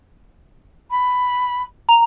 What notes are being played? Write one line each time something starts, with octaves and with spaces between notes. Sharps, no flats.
B5
A#5